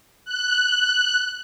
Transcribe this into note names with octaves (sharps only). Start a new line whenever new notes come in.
F#6